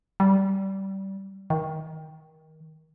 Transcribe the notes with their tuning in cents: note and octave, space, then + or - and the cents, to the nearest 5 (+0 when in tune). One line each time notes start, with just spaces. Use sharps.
G3 -20
D#3 +20